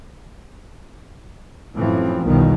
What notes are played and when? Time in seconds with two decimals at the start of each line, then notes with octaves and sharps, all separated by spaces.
1.75 F#2 A2 E3 F3 C4
2.25 B1 E2 B2 D#3 F3 G3